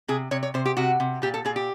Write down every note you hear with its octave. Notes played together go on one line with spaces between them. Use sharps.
C3 G#4
C3 C#5
C#5
C3 C5
G4
C3 F#4
C3
A#2 G4
A4
A#2 G#4
G4